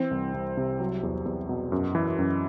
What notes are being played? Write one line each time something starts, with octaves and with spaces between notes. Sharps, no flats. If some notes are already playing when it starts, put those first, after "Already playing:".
Already playing: E3 C4
C2
C2
C3
F#3
E2
E2
B2
F#2
E3
F#2